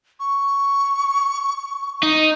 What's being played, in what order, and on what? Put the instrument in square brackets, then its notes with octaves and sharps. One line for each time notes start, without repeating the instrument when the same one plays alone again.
[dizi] C#6
[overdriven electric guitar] D#4